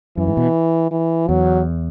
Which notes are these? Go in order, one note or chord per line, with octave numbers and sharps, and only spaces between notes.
F#2 E3
G#2
B2
E3
E2 F#3